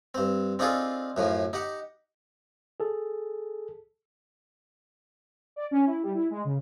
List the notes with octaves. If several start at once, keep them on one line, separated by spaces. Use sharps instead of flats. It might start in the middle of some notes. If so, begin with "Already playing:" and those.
G2 C4
C4 D4 D#4 F4 G#4 A4
F#2 A2 F3
D#4 G4 F#5
G#4 A4
D5
C#4
E4
G3
E4
G#3
C#3